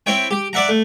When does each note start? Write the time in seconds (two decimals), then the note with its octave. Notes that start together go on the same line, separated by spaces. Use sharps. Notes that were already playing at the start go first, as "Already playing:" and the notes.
0.06 C4 E4 C#5 G5
0.31 G4
0.53 D5 E5 F#5 A#5
0.69 A3